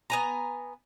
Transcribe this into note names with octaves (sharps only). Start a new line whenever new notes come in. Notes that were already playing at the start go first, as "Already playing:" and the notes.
B3 G#5 A#5